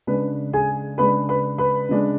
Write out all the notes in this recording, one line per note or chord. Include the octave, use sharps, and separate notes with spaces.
C#3 G#3 D4 B4
G#4 G#5
C#3 G#3 D4 B4 B5
B4 B5
B4 B5
C#3 G#3 D4